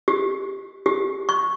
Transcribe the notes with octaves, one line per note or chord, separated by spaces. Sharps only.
G4
G4
C#6